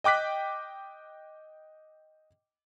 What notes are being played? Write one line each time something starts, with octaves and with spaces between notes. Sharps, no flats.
D#5 G5 D6 F#6 B6